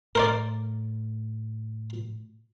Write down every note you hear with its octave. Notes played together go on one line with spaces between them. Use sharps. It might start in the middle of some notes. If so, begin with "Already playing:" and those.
A2 A#4 C5 D5